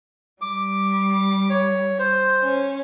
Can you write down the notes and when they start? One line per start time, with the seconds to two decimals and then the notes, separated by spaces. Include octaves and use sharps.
0.41 G3 D6
1.50 C#5
1.99 C5
2.41 C#4